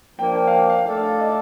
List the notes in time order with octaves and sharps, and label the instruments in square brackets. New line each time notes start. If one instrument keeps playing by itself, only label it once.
[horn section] F3 A#3 D4 [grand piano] G5
[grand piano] G5
F5
G5
F5
[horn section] A3 D4 A4 D5 [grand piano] F5
[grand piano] F5
D#5